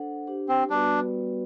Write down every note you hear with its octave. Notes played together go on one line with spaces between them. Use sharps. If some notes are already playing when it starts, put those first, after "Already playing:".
Already playing: D4 A4 C5 F#5
D4 G4 C5
C4
G3 B3 D4 F#4 B4 D5